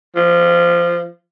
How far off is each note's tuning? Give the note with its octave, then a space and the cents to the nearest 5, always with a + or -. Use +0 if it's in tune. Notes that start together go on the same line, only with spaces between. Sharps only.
F3 -20